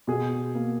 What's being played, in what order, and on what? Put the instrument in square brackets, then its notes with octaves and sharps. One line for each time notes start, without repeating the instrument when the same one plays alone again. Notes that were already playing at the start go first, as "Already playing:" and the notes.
[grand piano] B2 [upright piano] G#4
[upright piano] A#3